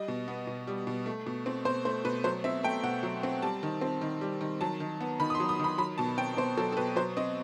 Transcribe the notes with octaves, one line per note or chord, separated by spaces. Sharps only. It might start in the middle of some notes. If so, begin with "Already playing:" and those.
Already playing: G3 D#5
B2
B3
B2
G3
B2
A3
B2
C4
B2 C5
A3 C5
B2 B4
F#3 C5
C4 E5
A3 G5
B2 F#5
F#3
C4
G3 A5
D#3
C4
D#3
G3
D#3
F#3 A5
D#3
B3
D#3 B5
D#6
C6
F#3
D#6
D#3 B5
F#3 B5
B2 A5
C4 G5
B2 C5
F#3 A4
A4
B2 B4
F#3 C5
C4 D#5